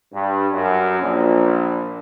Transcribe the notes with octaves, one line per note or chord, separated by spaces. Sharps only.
G2
F#2
A#1